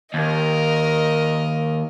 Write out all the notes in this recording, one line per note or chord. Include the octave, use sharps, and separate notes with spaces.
D#2 A#4 D#5